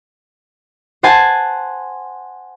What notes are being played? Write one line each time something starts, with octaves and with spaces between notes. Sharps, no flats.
C5 F#5 G#5 A5 G#6